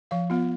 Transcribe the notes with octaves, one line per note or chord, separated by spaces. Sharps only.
F3 F5
B3 F4